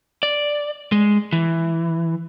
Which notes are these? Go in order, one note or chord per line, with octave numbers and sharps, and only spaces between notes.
D5
G#3
E3